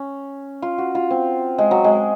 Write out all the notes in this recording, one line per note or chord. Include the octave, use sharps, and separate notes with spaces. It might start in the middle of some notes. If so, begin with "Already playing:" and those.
Already playing: C#4
F4
F#4
F4
C4
G#3
F#3
G#3